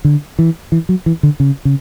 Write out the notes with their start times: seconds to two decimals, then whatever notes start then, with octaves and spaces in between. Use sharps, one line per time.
0.05 D3
0.39 E3
0.72 E3
0.89 F#3
1.06 E3
1.23 D3
1.40 C#3
1.65 C#3